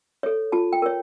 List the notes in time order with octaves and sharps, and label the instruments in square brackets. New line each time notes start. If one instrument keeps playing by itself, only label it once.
[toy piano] A4 C#5
F4 A5
G5
A#4 C#5